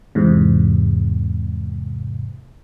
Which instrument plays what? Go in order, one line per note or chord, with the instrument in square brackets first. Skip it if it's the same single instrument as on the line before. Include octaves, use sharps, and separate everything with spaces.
[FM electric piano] E2 G#2 C3